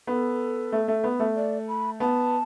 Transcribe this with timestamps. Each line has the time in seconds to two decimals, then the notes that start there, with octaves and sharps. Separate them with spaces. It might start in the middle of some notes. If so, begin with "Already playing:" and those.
0.07 B3 A4
0.72 A3
0.88 A3
1.04 B3
1.20 A3
1.36 D5
1.68 B5
2.00 B3 A5